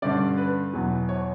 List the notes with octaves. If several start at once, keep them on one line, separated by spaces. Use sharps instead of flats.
G2 D3 G3 C#4 D5
B4
E2 B2 F#3
C#5